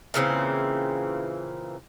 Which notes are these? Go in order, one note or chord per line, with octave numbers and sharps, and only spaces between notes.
A#2 C#3 E3 C4